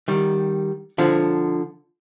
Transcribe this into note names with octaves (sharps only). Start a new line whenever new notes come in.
D#3 G3
D3 F3